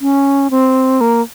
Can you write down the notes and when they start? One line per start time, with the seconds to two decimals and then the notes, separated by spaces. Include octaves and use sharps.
0.01 C#4
0.51 C4
1.01 A#3